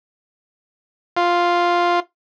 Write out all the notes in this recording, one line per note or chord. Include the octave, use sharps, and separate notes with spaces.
F4